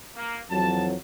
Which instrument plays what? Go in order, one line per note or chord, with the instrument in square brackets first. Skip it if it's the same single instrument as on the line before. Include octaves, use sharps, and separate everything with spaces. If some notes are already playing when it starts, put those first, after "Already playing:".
[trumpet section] A#3
[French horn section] F2 E3 F#3 [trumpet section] A5